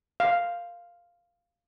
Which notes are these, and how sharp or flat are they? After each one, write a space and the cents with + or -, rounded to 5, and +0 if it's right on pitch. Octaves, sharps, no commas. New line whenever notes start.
F5 -5